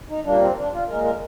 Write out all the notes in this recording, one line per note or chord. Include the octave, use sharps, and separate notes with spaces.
D#4
A#2 G3 A#3 D4
C4
D4
F4
A#2 G#3 A#4
A#4